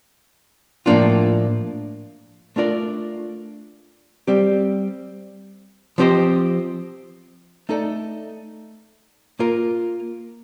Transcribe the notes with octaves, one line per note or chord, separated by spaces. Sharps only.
A2 F3 A#3 D4 F4
A3 D4 F4 A#4 D5
G3 C4 G4
F3 C4 G4 C5 D#5
A3 D#4 A4 D5
A#3 F4 A#4